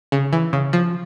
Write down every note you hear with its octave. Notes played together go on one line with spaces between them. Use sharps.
C#3
E3
C#3
F3